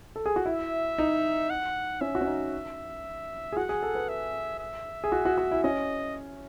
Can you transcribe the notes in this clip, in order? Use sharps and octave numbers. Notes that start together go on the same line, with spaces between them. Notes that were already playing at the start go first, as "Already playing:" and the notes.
A4
G#4
F#4
E4 E5
D#4
F#5
C#4 E5
F#4
C#4
D#4
G#4
F#4 F#5
G#4
A4
B4
E5
E5
G#4
F#4
F#4
F#4
E4
C#4 D#5